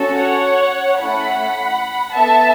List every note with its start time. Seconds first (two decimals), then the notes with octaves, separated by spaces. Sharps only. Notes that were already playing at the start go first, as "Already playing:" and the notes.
Already playing: C#4 F#4 A4
0.15 C#5 F#5
1.01 A3 C#4 E4 F#5 B5
2.14 B3 A4 E5 A5